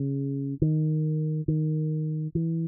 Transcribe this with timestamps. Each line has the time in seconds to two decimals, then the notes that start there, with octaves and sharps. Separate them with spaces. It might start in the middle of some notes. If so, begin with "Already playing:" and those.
Already playing: C#3
0.62 D#3
1.48 D#3
2.35 E3